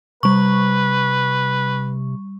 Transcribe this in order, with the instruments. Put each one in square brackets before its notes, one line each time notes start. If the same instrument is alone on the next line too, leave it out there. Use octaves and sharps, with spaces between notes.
[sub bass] C3 [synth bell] G3 C#6 [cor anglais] B4